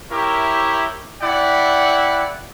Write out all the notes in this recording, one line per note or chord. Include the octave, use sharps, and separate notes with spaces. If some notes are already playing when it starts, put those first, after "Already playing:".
E4 G4 A#4 C#5 E5
E4 D5 F#5 G5 B5